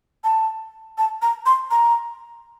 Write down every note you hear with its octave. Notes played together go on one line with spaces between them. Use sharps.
A5
A5
A#5
C6
A#5